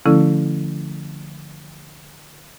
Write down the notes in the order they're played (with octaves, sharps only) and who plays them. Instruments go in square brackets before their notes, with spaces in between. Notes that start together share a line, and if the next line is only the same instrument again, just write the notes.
[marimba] D3 F3 A3 C#4 E4 A4